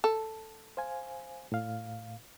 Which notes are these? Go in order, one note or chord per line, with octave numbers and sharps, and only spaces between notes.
A4
C5 F5 G#5
A2 F5